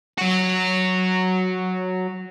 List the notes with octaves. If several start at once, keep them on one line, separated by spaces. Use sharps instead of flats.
F#3 F#4